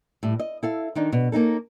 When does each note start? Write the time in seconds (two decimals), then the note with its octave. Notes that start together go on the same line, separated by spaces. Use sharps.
0.23 A2 G3
0.40 D#5
0.63 E4 A4 F5
0.95 D#3 D4 D#4
1.12 B2
1.32 A#3 C#4 D#4 A4